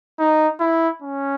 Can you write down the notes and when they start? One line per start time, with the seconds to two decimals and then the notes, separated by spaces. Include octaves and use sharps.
0.19 D#4
0.60 E4
1.02 C#4